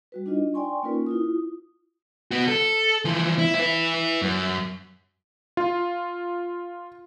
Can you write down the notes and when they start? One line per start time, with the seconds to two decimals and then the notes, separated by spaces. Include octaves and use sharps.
0.12 G3 F#4 B4
0.26 D4 D#4 F4 D#5
0.54 D5 G5 G#5 C6 C#6
0.83 A#3 C#4 D#4 F4 A#4 B4
1.07 E4 F4 D#6
2.31 B3 F#4
2.48 A4
3.05 E3 F3
3.39 E4
3.55 E4 B4
4.22 F#2
5.57 F4